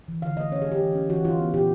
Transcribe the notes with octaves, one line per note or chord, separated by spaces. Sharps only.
E3
D3 F5
A3 D#5
C#4 C#5
F#3 G#4
G4
E3
C#4
E3 F#4
E3 F4
B3
A#2 G4